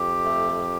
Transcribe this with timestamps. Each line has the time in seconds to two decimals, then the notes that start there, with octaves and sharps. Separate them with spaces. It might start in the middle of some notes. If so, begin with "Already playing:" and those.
Already playing: F2 G4
0.24 A3